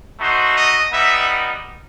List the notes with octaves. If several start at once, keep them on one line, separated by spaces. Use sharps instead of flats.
A3 D#4 F#4 C5
D#5
G3 B3 D#4 E5